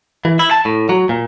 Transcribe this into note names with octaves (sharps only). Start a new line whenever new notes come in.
E3
E4
A5
A2
F#3
A#2